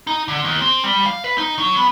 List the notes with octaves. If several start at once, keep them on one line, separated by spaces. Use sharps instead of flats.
D#4
D3
D#2
C4
G3
F5
B4
D#4
F#3
B3